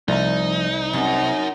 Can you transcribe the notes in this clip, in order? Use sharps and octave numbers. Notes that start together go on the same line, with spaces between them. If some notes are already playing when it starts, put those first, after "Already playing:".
C2 F3 A3 D#4 A#5
F#2 C3 C4